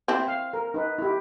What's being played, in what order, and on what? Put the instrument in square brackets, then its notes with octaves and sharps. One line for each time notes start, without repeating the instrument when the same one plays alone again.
[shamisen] C4 E4
[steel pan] F5
A#4
D#4 B4
E4 G4